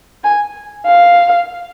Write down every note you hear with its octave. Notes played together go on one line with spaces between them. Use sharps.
G#5
F5